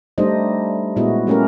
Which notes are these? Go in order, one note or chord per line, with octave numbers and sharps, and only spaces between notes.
G3 A3 D4 D#4 C5 D#5
A#2 G#3 B3 E4 F#4 D#5
G3 A3 C#4 G4 A#4